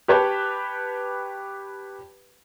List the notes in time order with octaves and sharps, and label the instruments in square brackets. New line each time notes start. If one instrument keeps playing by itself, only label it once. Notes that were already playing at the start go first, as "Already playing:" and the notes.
[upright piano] G4 B4 C#5 G5 A5